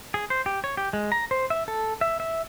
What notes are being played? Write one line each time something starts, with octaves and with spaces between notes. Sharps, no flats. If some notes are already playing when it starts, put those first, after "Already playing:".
G#4
C5
G4
C#5
G4
G#3
A#5
C5
E5
A4
E5
E5